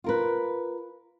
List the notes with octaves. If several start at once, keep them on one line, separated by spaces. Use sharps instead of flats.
F4 A#4 B4